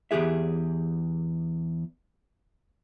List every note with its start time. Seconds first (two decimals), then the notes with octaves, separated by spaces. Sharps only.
0.11 E2 G2 G4 G#4 E5